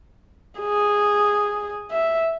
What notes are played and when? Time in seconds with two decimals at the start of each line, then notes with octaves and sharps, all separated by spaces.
0.60 G#4
1.91 E5